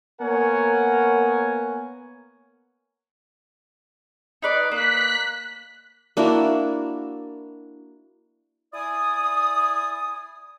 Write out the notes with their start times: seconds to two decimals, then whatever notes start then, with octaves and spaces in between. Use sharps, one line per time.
0.21 A#3 B3 A#4 C#5 F#5 G#5
4.42 D#4 B4 D5
4.72 A#3 F#6 B6
6.17 A#3 D4 E4 F#4
8.74 E4 D5 G#5 D#6